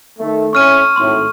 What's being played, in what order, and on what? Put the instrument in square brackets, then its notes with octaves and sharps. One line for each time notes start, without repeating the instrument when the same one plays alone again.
[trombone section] D#3 A3
[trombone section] A2 A3 C#4 [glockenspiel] C#6 F6 D#7
[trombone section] G#1 A2 [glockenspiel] C6